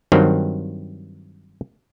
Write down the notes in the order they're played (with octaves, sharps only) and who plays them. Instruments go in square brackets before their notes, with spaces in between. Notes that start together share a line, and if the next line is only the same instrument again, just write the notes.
[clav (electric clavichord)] G2 D#3 F#3 C4